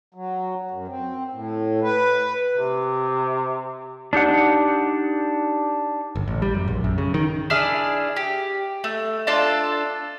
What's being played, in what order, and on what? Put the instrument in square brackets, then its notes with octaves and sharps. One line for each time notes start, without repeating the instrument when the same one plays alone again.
[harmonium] F#3
F#2
C4
A2
B4
[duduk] C3
[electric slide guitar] D4 D#4 G4 F#5
[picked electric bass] G1
A1
G3
F#2
A#1
F#2
C#3
D#3
[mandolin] D4 E4 G#4 F6
G4
A3
D4 F4 A4 A5